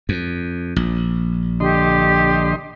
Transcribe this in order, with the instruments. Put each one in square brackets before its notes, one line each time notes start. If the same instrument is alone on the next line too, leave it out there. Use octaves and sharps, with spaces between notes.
[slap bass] F2
A#1
[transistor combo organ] D3 D#5 C6 [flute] G4